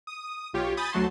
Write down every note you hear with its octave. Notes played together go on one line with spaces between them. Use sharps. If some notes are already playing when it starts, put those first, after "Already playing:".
D#6
B1 F4 G4 C#5
G#5 B5 D#6 G6 A6
D2 F#3 A3 F#4 A5 C6